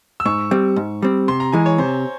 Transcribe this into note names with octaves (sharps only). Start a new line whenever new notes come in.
E6
G#2 C#6
G3 C4
G#2
G3 C4
C3 C6
A#5
E3 G#3 G#5
C#5
C3 C5